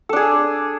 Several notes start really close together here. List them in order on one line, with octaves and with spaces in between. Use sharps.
A4 D4 G#4